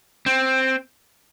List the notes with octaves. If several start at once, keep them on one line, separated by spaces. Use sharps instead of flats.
C4